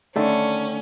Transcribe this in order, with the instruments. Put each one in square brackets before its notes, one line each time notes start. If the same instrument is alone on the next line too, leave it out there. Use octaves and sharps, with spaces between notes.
[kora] D3 D#3 [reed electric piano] A3 A4 [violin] C#4